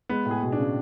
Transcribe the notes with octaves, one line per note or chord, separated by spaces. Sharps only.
G#3 B3
A2
G#4
B2
D4
C#3